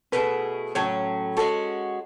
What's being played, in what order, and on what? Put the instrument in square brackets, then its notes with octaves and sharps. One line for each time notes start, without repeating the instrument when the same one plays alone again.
[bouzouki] B2 A3 E4 G#4 [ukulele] B4
[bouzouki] A2 F#3 C#4 [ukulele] C#5
[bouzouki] G#3 C#4 F#4 [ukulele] A4